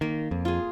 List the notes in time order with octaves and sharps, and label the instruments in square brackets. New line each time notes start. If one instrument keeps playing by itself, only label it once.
[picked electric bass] D#3 [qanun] A#3
[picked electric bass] F2
[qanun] F4 G#4